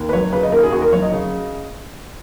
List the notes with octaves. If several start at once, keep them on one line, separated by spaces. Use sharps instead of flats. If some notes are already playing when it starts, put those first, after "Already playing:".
Already playing: D#2
B4
F#3 C#5
C#3 B4
D#5
D#2 A#4
G#4
D#2 F#4
A#4
F#3 C#5
D#5
C#3